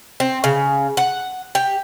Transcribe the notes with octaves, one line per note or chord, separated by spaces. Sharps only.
C4
C#3
F#5
G4